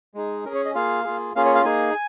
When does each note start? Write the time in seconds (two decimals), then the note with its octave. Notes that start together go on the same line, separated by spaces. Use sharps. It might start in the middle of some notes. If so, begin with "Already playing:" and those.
0.14 G#3 D#4 G#4
0.45 C#4 A#4
0.48 G#4
0.55 C#5
0.65 D#5
0.74 A#3 F4 G#4 F5
1.04 A#3 F4 G#4
1.35 A#3 C#4 F4 G#4 F5
1.45 C#5
1.55 F5
1.64 A#3 D#4 G#4 G#5